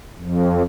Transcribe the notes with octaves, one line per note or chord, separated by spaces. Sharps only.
F2